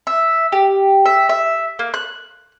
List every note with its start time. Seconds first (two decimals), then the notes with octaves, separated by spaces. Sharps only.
0.07 E5
0.52 G4
1.06 E5
1.29 E5
1.79 A#3
1.94 F#6